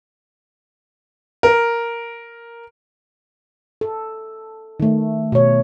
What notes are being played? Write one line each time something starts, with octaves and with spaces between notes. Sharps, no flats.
A#4
A4
D#3 A3
B2 C#5